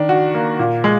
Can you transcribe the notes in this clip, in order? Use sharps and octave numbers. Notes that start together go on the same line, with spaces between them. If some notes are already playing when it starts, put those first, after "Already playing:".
Already playing: D#3 D4
F#4
A#3
A#2
G#3